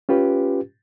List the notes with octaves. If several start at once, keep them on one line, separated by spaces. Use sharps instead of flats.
C#4 F4 G4 B4